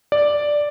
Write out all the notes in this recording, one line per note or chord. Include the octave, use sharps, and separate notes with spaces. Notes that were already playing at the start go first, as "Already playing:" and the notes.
D5